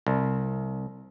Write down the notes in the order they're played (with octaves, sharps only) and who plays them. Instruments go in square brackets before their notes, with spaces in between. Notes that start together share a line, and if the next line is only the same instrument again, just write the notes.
[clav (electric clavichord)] C2